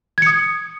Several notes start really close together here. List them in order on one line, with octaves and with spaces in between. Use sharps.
G#6 C#7 D#6